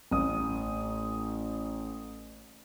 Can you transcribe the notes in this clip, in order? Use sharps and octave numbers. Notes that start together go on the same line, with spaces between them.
A1 D#6